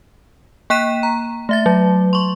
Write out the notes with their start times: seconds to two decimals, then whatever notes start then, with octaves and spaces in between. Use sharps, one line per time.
0.70 A#3 G5 F#6 B6 D#7 E7
1.03 A#5
1.49 A3 E5 A6
1.66 F#3
2.13 C6 C#6